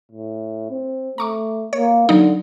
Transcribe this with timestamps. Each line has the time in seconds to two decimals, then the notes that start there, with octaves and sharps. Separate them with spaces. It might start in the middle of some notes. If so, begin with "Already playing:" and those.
0.12 A2
0.70 C4
1.18 A3 A#5 C#6 D6
1.73 A#3 C#5
2.09 D3 F#3 D#4